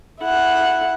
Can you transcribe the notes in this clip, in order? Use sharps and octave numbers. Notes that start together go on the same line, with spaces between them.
E4 F#5